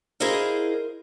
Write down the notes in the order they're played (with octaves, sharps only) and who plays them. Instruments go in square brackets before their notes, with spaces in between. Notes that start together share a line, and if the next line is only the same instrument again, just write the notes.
[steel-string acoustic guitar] E4 G#4 A#4 C5 D#5 F5